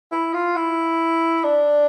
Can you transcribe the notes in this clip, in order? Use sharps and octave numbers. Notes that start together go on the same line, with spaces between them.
E4
F4
E4
D4